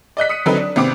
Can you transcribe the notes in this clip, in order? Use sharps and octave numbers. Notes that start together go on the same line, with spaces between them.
D5 D#5 F#6 B6
D#6 C#7 D#7
D3 F#3 C4 D#4 A4 B4
D4
G#1 C3 B3 C4 D6